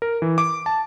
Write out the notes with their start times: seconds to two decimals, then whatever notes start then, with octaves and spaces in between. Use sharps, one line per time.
0.02 A#4
0.22 E3
0.38 D6
0.66 A5